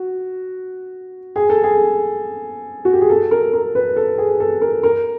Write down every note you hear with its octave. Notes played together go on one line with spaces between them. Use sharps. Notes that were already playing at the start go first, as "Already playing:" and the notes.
Already playing: F#4
G#4
A4
G#4
F#4
G4
G#4
A4
A#4
A#4
B4
A4
G#4
A4
A#4
A#4